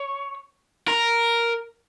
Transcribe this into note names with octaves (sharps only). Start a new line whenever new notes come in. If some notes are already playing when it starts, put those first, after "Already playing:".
Already playing: C#5
A#4